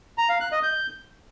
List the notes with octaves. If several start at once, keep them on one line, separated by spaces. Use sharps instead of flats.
A#5
F5
F#6
D#5
G6